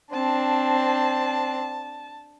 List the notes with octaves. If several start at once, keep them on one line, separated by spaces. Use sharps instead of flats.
C4 D4 A5